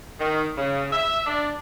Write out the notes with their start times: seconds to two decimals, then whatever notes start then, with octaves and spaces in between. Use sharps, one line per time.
0.19 D#3
0.58 C#3
0.92 E5
1.26 D4